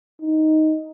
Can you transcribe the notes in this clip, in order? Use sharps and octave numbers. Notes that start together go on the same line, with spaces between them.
D#4